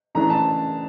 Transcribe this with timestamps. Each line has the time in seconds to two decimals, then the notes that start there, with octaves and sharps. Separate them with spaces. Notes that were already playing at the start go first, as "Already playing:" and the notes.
0.15 C#3 E3 A3 D4 A#5
0.30 A5